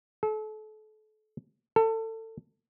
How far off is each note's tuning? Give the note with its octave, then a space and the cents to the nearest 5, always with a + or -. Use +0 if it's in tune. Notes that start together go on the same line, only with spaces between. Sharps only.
A4 -35
A4 +25